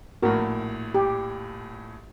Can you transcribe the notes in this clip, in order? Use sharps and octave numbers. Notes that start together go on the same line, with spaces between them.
A#1 A2 F#4 A#4
G4